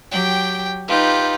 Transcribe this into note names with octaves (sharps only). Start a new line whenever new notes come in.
F#3 G4 G5
D#4 F4 G4 B4